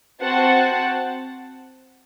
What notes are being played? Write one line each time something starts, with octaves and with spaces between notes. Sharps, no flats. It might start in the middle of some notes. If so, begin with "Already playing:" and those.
C4 F#4 C5 F#5 A5